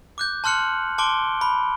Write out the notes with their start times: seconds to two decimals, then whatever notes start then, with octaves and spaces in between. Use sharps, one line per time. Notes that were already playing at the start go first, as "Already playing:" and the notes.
0.18 D6 F#6 G6
0.44 A5 C6 F6 F#6 C#7 F#7
0.98 A5 C6 D6 D7 G7
1.41 B5